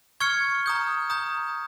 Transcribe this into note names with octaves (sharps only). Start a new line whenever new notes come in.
C#6 F6 G#6 C#7
A#5 D#6 G6
A#5 D#6 G6